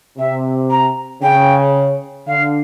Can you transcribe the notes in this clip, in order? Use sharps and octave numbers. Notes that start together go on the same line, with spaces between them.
C3 E5
A#5
C#3 G5
D3 F5